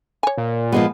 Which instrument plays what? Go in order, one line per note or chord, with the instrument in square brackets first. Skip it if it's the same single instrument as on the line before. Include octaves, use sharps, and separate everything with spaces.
[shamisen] C#5 G#5
[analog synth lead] A#2
[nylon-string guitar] F3 G#3 B3